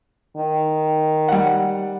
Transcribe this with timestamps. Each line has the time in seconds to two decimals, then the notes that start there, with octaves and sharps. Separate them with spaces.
0.37 D#3
1.28 G3 F#5